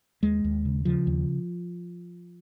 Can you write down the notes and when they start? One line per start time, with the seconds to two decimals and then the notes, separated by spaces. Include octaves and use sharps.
0.23 D#2 G#3
0.44 D#2
0.65 C#3
0.85 C#3 F3
1.07 D#2